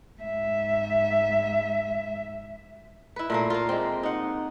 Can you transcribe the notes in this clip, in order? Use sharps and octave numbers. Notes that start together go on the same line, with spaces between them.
G#2 E5
E4 B4
A#2 A3 A#3
A#3 F4
G#3 C4
D#4 F#5